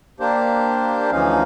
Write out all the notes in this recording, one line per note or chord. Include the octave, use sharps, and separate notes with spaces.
A#3 D4 G4 C5
D2 E3 F3 C#4 D#4 F5